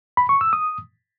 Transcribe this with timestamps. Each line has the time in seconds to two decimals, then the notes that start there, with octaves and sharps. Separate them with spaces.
0.17 B5
0.29 C#6
0.41 E6
0.53 D#6